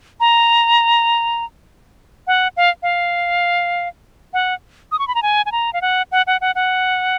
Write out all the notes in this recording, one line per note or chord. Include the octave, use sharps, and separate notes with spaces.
A#5
F#5
F5
F5
F#5
D#6
C#6
B5
A#5
G#5
G#5
A#5
F5
F#5
F#5
F#5
F#5
F#5